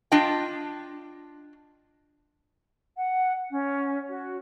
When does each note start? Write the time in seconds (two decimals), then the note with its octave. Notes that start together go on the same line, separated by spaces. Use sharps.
0.12 D4 F4 D#5 G5
2.96 F#5
3.50 C#4
4.08 F#4